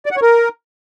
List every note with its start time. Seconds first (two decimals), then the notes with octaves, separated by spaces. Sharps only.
0.06 D5
0.11 F#5
0.17 C#5
0.22 A#4